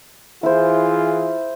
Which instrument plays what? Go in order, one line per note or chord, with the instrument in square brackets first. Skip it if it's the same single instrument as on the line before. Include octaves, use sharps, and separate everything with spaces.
[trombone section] E3 F4 G#4 [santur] E4 C5